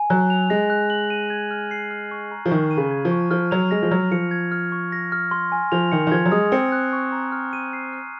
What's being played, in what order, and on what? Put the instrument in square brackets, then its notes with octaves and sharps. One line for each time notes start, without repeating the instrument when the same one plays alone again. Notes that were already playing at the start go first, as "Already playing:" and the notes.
Already playing: [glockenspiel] G#5
[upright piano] F#3 [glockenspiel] F#6
[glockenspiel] F7
[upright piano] G#3 [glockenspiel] A#6
[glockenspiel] F#6
F#7
D#7
G#6
F6
C7
F6
C#6
A#5
[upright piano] F3
[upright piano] D#3 [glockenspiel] C#6
[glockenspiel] D#7
[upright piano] C#3
[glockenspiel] G#6
[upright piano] F3
[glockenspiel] C#6
[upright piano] F3 [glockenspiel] F6
[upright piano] F#3 [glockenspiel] F7
[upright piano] G#3 [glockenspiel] A#6
[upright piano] F3
[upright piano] F#3 [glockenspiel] F6
[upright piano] F3 [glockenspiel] C#7
[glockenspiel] G#6
F6
C#6
A#6
F6
C6
G#5
[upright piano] F3 [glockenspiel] F7
[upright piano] D#3 [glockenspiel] C#7
[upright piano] D#3
[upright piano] F3 [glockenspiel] G#6
[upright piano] F#3
[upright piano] G#3 [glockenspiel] D#6
[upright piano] C4 [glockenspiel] C#7
[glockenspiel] F#6
C#6
A#5
F6
D#7
C7
F6